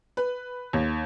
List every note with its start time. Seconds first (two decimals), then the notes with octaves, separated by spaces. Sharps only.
0.17 B4
0.73 D#2